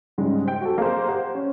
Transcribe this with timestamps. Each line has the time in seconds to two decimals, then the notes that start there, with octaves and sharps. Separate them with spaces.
0.18 G#2 C#3 G3 G#3
0.45 C5 G5
0.61 F#4 A4
0.78 A#3 C4 G#4 C5
1.08 G4 C5 F#5
1.35 C#4